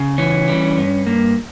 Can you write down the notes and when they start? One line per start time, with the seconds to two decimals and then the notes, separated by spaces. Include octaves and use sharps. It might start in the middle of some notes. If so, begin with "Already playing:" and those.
Already playing: C#3
0.18 E3 C#4
0.48 G3
0.78 G2
1.06 G2 A#3